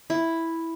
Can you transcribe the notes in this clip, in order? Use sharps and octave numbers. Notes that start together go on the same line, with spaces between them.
E4